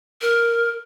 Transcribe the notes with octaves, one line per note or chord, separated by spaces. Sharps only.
A#4